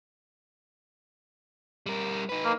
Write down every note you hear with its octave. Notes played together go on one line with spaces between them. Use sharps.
G3 A#4
D#4 B4
A#3